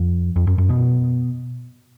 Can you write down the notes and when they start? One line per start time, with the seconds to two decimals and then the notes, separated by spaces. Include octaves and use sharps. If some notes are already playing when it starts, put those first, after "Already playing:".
Already playing: F2
0.36 F2
0.47 F#2
0.58 F#2
0.69 B2